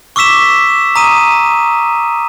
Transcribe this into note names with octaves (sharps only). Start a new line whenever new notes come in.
C#6 D6 E6 B6 E7
A#5 D#6 D#7